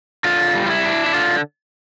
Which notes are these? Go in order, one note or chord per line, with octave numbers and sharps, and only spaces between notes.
D3 F4
G3
F4
E4
D4
E4
D3 F4